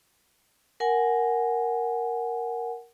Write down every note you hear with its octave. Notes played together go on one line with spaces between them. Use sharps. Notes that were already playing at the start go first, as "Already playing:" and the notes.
A#4 F#5 G#5